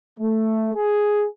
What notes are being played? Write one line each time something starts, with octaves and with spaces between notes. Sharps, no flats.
A3
G#4